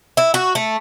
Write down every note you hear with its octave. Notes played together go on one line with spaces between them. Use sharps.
E4
F#4
A3